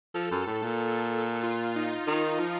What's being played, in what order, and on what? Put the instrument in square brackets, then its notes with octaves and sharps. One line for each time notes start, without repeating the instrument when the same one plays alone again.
[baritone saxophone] F3 [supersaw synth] A4
[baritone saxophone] F#2
A2
A#2
[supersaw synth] F4
D#4
[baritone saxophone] D#3 [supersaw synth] F4
[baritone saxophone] F3